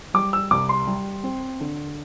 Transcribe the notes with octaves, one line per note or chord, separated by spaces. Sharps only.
G3 D6
E6
C2 D6
C6
G3
C4
D3